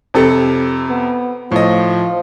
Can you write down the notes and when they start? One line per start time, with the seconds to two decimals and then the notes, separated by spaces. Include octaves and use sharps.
0.14 F2 C3 A4
0.90 B3
1.52 A2 F3 D#5